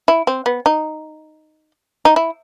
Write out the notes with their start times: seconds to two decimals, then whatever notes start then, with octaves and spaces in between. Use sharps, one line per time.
0.08 E4
0.27 C4
0.46 B3
0.66 D#4
2.05 D#4
2.16 E4